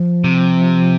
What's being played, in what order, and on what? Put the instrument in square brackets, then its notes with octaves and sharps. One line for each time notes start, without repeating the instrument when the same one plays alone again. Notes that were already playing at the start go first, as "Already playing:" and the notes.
Already playing: [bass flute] F3
[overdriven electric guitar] C3